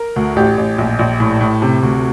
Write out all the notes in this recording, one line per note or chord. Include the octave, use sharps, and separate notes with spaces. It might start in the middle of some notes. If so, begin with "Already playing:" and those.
Already playing: A#4
D2
A1 G4
A1
A#1
A#1
A2
A2
C3
D2